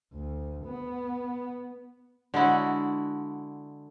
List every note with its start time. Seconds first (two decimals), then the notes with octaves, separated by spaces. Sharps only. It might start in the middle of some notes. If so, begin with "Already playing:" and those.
0.13 D2
0.65 B3
2.34 D3 G#3 E4 F#4